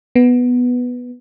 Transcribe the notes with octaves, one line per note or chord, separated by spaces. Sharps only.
B3